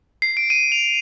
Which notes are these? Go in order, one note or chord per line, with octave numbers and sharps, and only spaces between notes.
C7
D7
D#7
F7